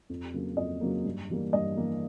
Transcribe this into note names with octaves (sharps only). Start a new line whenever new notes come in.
F2
C#3 F#3 A#3
F2 D#5
C#3 F#3 A#3
G2
E3 G3 A#3
G2 D#5
E3 G3 A#3